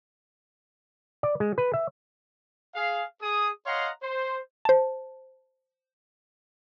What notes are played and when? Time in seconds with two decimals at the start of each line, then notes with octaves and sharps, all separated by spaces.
1.23 D5
1.40 G#3
1.58 B4
1.74 E5
2.75 G#4 F5
3.22 G#4 D#6
3.66 C#5 D#5 F5 F#5 A#5 C6
4.03 C5
4.65 C5 A5